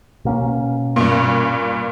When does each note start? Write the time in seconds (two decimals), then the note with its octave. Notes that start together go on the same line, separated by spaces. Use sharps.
0.25 B2 A#3 C#4
0.96 G2 A#2